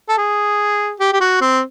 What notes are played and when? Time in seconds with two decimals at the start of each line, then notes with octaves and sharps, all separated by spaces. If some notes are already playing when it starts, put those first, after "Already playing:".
0.09 A4
0.17 G#4
1.00 G4
1.13 G4
1.21 F#4
1.41 C4